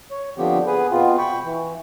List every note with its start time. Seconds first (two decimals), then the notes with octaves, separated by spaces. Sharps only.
0.11 C#5
0.38 D3 F3 B3 C4 G4
0.67 B3 G#4 B4
0.91 B2 B3 C4 F4
1.18 G5 B5 C#6
1.44 E3